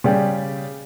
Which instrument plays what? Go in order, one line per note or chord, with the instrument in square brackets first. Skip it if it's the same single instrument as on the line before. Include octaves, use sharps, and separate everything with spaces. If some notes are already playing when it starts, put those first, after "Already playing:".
[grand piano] C#3 G3 D5 G5